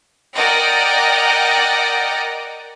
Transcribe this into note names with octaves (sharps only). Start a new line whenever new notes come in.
A#4 D5 D#5 F#5 G5